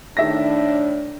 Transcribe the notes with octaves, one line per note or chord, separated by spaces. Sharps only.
A2 D#3 D4 E5 A#6